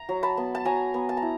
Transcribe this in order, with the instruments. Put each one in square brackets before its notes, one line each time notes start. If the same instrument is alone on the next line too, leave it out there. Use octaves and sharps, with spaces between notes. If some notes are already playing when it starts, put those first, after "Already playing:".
Already playing: [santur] A#5
F#3
A5 B5
B3
A5
F#3 G#5 A#5
B3
A5
A#5
E4